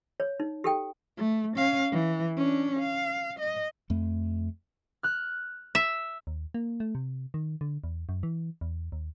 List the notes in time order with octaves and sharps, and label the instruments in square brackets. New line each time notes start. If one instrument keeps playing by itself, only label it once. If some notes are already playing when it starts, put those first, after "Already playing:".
[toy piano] C#5
D#4
G4 A4 G5
[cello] A3
C#4 F5
E3
C#4 D4
F5
D#5
[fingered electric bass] F2 A3
[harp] F6 F#6
[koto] E5
[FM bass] D#2
A#3
A3
C3
D#3
D3
E2
F#2
E3
E2
D#2